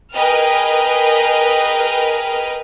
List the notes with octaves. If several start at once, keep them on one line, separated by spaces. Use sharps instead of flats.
G#4 A#4 B4 D#5 G5 F6